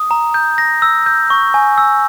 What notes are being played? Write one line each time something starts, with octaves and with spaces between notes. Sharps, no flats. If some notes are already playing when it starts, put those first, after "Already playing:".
Already playing: D#6
A#5
G6
A#6
E6
G6
C#6
G#5
E6